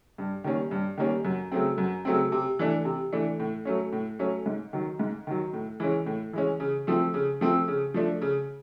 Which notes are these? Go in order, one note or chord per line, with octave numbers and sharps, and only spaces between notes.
G2
D#3 G3 A#3 C#4
G2
D#3 G3 A#3 C#4
F#2
C#3 F#3 A3 C4
F#2
C#3 F#3 A3 C4
C3
E3 A3 D4
C3
E3 A3 D4
A2
F#3 A3 C#4
A2
F#3 A3 C#4
G#2
D#3 F#3
G#2
D#3 F#3
A2
E3 G#3 C#4
A2
E3 G#3 C#4
C#3
F3 A3 C4
C#3
F3 A3 C4
C#3
F3 A3 D4
C#3